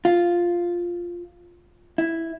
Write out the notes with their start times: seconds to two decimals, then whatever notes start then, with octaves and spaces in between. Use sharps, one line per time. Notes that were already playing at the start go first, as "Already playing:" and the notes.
0.05 F4
1.98 E4